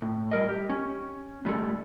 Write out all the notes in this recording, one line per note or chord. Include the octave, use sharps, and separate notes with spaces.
A2
G3 A#4 D#5
G4
C#4
A2 G3 G#3 A4